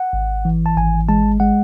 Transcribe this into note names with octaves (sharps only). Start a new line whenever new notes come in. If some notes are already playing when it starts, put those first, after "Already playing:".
Already playing: F#5
G#1
E3
A5
G#1 G#5
G#3 A5
G#3 F#5